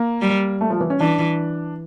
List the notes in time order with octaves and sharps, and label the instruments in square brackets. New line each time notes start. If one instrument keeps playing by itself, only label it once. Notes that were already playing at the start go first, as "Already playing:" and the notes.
Already playing: [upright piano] A#3
[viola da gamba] G3
[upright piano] A3
F3
E3
C#4
[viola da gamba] E3 [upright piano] D4